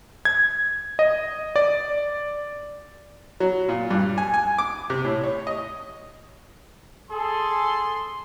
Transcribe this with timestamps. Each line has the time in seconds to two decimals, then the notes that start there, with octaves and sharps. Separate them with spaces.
0.25 G#6
0.99 D#5
1.56 D5
3.40 F#3
3.69 A#2
3.91 G2
4.18 G#5
4.34 G#5
4.58 D6
4.90 C3
5.05 A2
5.24 C#5
5.47 D#5
7.11 G#4 A4 C6